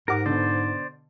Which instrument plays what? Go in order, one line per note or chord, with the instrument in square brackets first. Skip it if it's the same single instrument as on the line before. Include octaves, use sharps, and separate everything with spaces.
[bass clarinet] G#2 [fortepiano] G4 F#5 D6 [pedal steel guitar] A#4
[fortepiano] B2 D3 [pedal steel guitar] C5 D5